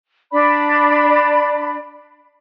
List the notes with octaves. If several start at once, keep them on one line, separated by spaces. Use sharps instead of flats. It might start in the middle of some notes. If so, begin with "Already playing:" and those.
D4 D5 B5